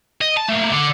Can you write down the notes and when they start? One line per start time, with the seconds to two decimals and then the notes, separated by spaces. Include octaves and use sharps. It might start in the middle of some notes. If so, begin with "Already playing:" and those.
0.21 D#5
0.37 A5
0.48 A3 A#3
0.71 D3